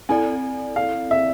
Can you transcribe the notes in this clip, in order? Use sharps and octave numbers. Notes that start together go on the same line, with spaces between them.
C4 E4 A4 D5 G#5
F5
E5